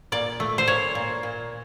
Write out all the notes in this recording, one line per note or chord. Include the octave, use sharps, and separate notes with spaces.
A#2 D5
A3
C5
A#2 C#5
A#2
A#2